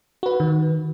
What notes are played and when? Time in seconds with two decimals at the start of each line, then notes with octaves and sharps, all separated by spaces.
0.23 F#4 B4
0.40 D#3